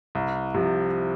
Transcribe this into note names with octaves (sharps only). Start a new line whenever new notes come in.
C2
C3 F3